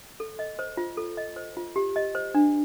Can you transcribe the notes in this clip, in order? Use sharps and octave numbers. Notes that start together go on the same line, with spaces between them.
A4
D#5
C5
F4
A4
D#5
C5
F4
G4
D#5
C5
D4